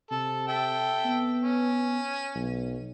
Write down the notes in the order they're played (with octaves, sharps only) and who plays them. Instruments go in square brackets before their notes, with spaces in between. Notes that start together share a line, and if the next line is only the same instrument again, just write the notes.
[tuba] C3 [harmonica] A4
[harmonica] A4 E5 G5
[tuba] B3
[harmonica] C#4
[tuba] B1